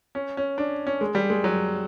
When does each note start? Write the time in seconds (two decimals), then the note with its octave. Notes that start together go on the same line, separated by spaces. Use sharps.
0.15 C#4
0.37 C#4
0.58 D4
0.87 C#4
1.01 G#3
1.15 G3
1.30 G#3
1.44 F#3